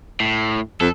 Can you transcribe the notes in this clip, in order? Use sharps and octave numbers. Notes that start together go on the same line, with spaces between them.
A2
F2 A4